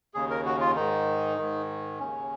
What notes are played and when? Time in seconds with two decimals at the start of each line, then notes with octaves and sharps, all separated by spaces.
0.14 D#2 C#3 G#4
0.30 A#4
0.46 F#4
0.60 F4
0.76 G#2 D#3 D#4
1.38 G#2 D#3
2.00 D#2 C#3 C#4